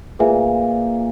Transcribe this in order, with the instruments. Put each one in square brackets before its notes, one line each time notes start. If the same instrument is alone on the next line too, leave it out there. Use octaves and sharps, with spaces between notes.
[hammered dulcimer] A#2 [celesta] G#4 B4 E5 G#5